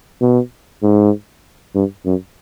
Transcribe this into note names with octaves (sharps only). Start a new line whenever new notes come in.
B2
G#2
G2
F#2